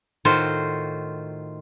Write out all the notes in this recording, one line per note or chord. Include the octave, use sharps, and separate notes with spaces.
A2 D#3 F4 F#4 C5